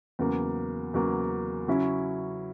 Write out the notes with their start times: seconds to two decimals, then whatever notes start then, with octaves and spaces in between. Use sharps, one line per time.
0.19 E2 C#3 F#3 A#3
0.94 E2 C#3 F#3 A#3
1.68 C#3 F#3 C#4 E4